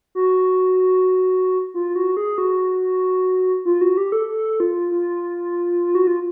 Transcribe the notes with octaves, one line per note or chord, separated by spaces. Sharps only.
F#4
F4
F#4
G#4
F#4
F4
F#4
G4
A4
A4
F4
F4
F#4
F4